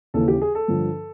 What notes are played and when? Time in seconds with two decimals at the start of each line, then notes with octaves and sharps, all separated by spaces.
0.14 D#2 C#3 E3 A4
0.28 G4
0.41 G#4
0.55 A4
0.68 G2 D3 F3